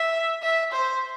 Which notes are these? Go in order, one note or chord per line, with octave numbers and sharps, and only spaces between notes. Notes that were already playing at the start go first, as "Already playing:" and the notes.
Already playing: E5
E5
C5